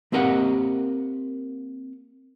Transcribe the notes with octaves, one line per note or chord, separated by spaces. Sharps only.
A#3 C4 G4 A#4 D#5 F#5